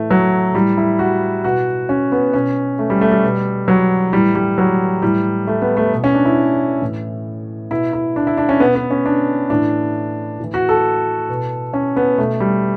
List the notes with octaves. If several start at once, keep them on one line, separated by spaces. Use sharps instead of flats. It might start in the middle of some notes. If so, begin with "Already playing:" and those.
Already playing: A2 E3 A3
F#3
A2 E3 G3
E4
F#4
B2 F#4
C#4
B3
B2 C#4
A3
G3
A3
G3
B2
F#3
A2 E3 G3
G3
F#3
A2 E3 G3
A3
B3
A3
B2
C#4
D4
E4
A2 E3
B2 E4
E4
D4
E4
D4
C#4
B2 B3
B3
C#4
D4
A2 E3 D4
A2 E3
F#4
A4
B2
C#4
B3
B2 A3
G3